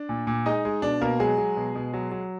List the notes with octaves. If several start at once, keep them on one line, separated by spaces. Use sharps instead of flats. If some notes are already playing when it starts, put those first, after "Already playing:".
Already playing: D4
A#2
A#2
G#3 D#4 D#5
G#3
B2 D4 D5
B2 A#3 A#4
F#3 G#3 G#4
F#3
B2
B2
F#3
F#3